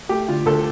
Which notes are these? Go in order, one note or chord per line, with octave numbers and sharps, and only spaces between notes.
A3 G4
D3 F4
D2 A4